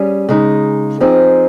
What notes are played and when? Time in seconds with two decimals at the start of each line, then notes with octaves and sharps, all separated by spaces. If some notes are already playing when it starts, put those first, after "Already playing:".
Already playing: G3 C#4 G#4
0.29 C#3 G#3 D#4
1.00 F3 C4 D#4 G#4